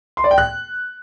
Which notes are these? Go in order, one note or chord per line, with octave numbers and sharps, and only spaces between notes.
C6
D5
G5
F#6